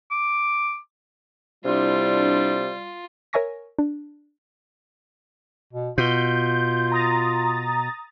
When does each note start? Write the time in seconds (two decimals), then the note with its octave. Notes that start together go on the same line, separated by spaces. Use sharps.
0.11 D6
1.65 C3 G3 D4 E4 F4
3.33 A#4 C#5 E5 G#5 C#6 A#6
3.79 D4
5.73 B2
5.98 B2 F4 G6
6.92 A#5 D#6 A6